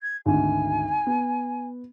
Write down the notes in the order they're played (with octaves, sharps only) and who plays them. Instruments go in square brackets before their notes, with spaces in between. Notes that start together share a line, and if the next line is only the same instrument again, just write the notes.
[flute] G#6
[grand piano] G#1 D2 [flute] G#5
[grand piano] B3